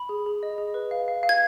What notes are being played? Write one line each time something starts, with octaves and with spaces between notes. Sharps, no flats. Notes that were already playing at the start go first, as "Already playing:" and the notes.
Already playing: B5
G#4
G#4
D#5
G#4
B4
F5
F5
F5
G#6